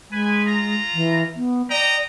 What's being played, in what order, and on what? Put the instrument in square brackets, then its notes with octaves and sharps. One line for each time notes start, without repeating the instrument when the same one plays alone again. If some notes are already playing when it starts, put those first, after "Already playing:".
[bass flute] G#3 [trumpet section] B4 G#5
[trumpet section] F4 A#5
[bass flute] E3
B3
[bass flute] D5 [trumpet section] D#5 G5 A#5